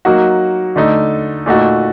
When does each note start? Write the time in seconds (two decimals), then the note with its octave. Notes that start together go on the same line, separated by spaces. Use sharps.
0.05 F#3 A#3 D#4 F#4
0.76 D3 A3 D#4
1.46 A#2 A3 D#4 F#4